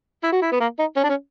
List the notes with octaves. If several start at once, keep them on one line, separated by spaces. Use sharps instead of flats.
E4
F#4
E4
B3
A#3
D#4
C#4
D4
C#4